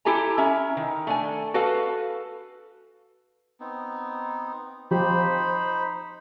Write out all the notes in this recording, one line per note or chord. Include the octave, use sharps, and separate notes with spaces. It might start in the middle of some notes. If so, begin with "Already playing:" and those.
E4 G4 A4 G#5 A#5
C#4 E5 A#5
D#3
A3 D4 G#5
F#4 A4 B4 F5
B3 C4 D#4
F3 D#4 G4 C5 B5